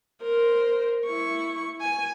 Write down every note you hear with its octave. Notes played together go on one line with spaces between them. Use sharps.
A#4 C5
E4 C#6
G#5